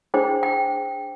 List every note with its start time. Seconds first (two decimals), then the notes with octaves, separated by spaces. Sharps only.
0.14 D4 G#4 C5 G5
0.43 G5